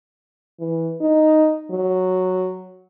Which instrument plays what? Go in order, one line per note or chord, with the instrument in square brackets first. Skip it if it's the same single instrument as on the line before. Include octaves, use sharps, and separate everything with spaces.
[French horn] E3
D#4
F#3